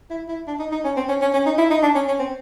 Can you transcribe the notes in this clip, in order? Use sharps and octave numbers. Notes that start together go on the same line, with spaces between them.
E4
E4
D4
D#4
D#4
C#4
C4
C#4
C#4
C#4
D#4
E4
D#4
D4
C#4
C#4
C4